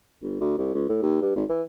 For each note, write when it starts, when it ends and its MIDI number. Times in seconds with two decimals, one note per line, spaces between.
0.22 0.40 31
0.41 0.54 38
0.58 0.71 36
0.75 0.87 37
0.89 1.01 45
1.02 1.17 39
1.22 1.32 43
1.36 1.44 32
1.49 1.62 52